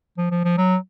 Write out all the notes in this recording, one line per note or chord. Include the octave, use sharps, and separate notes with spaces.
F3
F3
F3
F#3